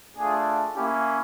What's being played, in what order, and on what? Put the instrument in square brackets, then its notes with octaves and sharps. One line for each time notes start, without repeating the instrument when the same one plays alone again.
[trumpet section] A3 D4 F4 G#4
A#3 C#4 E4 G4